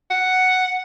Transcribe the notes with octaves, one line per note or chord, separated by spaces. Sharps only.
F#5